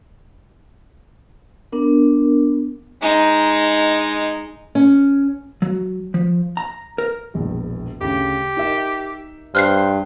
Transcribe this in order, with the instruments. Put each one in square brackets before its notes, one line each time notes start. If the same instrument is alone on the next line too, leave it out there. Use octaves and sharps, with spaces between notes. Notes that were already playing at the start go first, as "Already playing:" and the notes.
[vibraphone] B3 D4 A#4
[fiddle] G#3 D#4
[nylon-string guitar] C#4
[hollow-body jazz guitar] F#3
F3
A#5
A#4
[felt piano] E1 A#1 E2
[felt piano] D2 C#3 [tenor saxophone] G4
[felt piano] D#4 A#4 E5
[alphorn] G2 [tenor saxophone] C5 [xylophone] F6 F#6 C7